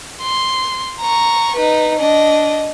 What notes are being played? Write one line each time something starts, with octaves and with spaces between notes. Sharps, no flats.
C6
A#5 C#6
D#4 B4
D4 D#5